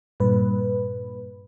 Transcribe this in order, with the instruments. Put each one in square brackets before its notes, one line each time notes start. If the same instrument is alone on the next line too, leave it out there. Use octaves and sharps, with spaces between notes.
[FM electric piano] G2 A#2 B4